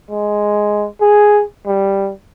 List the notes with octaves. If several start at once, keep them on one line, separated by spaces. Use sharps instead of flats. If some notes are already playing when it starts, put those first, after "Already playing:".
G#3
G#4
G3